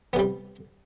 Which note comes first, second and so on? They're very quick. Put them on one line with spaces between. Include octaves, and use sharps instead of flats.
B3 C3 G3